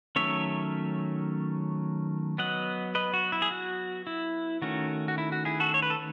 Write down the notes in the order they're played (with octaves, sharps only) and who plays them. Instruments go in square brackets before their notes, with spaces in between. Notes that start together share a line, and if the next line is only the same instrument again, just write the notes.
[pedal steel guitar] D#3 F#3 A3 C#4 C#5 E5
F#3 B3 D#5 F#5
B4 D#5
F#4
E4
G#4
F#4
E4
D#3 A3 C#4 F#4
F#4
E4
F#4
E4 G#4
F#4 A4
C#5
B4
A4